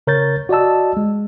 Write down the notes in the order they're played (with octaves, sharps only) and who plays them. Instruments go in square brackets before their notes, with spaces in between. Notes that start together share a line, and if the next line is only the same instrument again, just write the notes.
[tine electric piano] C#3 A#4 C#5 G6 A6
F#4 D5 D#5 A5 E6
G#3